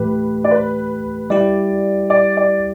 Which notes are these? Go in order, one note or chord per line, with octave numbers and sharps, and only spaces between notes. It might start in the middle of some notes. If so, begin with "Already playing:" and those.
Already playing: A2 E3 A3 G4 B4
D5
B4
G3 E4 G4 D5
D5
D5